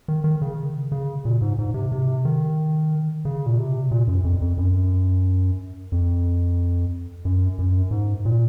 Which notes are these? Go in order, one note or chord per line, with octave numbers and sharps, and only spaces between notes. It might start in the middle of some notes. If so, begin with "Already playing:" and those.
D#3
D#3
C#3
C#3
A#2
G#2
G#2
C3
C3
D#3
C#3
A#2
C3
A#2
F#2
F2
F2
F#2
F2
F#2
F#2
G#2
A#2